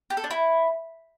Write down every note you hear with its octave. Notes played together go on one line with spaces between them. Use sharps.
G4
A4
D4
E4